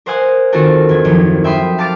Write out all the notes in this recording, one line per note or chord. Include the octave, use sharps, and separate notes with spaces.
A#4 C5 F5 F#5 G#5 D#6
D#3 C4 F4 F#4 A4 A#4
E1 G#6
F#1 D#2 F3
E5 G5 B5 C6 D#6
F5 A5 D6 F6 A6 D7